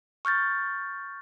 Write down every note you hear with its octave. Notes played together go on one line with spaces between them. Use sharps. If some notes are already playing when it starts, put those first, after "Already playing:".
C#6 F6 G6 A6